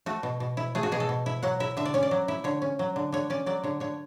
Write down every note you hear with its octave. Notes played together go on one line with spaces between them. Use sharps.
A3 F#4
B2
B2
E4
A3 G#4
F#4
B2 G#4
A4
B2
E4
F#3 F#5
E4 E5
D3 E5
D5
C#4 C#5
D5
F#3
E4
D3 C#5
C#4
F#3
D3
D3 C#5
C#4 D5
F#3 D5
D3 C#5
D3 C#5